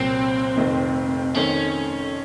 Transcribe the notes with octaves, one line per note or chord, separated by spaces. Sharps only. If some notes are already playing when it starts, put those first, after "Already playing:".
Already playing: C2 A#2 F#3 C4
F1 F2 D#3
F2 D#3 A3 C4 C#4